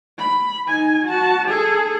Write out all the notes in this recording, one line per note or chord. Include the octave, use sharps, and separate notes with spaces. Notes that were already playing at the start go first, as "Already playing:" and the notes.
B5
D#4 G#5
F#4 A5
G#4 A4